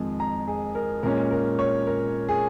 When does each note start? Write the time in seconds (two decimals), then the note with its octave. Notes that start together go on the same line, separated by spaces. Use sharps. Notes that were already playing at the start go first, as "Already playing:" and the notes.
Already playing: F2 D#3 G#3
0.20 A#5
0.48 G#4
0.75 A#4
1.03 A#2 G#3 C#4 A#4
1.31 A#4
1.59 C#5
1.87 A#4
2.29 G#4